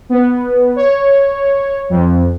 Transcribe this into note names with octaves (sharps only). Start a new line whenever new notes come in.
B3
C#5
F2